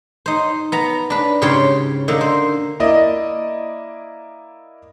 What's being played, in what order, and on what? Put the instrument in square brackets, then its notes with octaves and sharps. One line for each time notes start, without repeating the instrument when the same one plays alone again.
[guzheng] D#4 C5
B3 A#5
D4 B4
G#2 C#3 G4 C5 C#5 G5
D3 A#3 D#4
C5
[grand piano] A#3 E4 D5 D#5